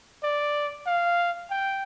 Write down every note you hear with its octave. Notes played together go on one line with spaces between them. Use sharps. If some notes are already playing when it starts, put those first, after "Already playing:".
D5
F5
G5